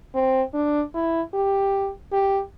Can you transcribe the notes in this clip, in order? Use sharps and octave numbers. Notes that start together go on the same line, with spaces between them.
C4
D4
E4
G4
G4